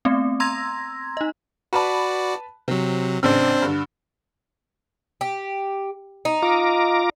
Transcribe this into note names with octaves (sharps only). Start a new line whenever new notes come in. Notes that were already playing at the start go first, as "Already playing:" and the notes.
A3 B3 C4
A#5 C6 E6 G#6 A#6
D#4 D#5
F#4 B4 D5 A5 B5
C3 F#3 C4
A1 C#3 C4 D4 C5 E6
G2 D3
G4
D#4
F4 A#5 D6